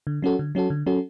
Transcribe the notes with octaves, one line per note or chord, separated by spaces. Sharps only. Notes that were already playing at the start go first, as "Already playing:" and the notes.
D3
F#3 C#4 F#4 A4
D3
F#3 C#4 F#4 A4
D3
F#3 C#4 F#4 A4